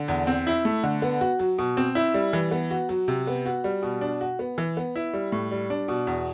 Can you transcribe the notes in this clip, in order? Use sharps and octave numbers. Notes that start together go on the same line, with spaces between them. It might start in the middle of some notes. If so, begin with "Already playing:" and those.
Already playing: D3
E2
C4
E4
A3
D3
B3
F#4
F#3
B2
C4
E4
G3
E3
B3
F#4
F#3
C3
B3
F#4
G3
B2
D4
F#4
B3
E3
B3
E4
G3
A2
G3
D4
B2
E2